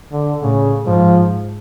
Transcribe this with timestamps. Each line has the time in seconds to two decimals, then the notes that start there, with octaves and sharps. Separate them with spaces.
0.12 D3
0.42 A2 C#3
0.86 G#2 F3